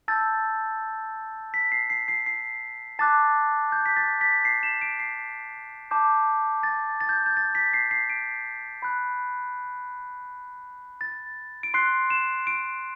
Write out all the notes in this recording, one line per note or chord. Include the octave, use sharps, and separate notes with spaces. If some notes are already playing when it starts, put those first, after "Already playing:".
A5 E6 G6 A6
B6
C7
C7
C7
C7
A5 D6 F#6 A6
G6
B6
A6
B6
C7
E7
D7
C7
A5 D6 G6
A6
A6
G6
G6
A6
B6
C7
C7
D7
B5 F#6
A6
D7
C6 F#6 C7
E7
D7